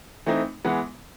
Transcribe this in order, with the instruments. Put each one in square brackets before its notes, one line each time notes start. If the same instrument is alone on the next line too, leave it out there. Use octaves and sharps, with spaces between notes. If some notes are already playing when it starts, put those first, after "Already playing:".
[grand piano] E3 A3 C4 D#4
E3 G#3 B3 F#5